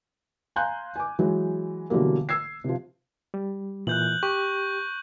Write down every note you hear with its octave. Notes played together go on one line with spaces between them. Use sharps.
F5 G#5 A#5 C6 F#6 G6
G#5 D6
E3 F#3 G#3
B2 D3 E3 F#3 G3 A#3
E6 G#6 C7
C3 F3
G3
A#2 E3 F#6 G6 F#7
G4 C#6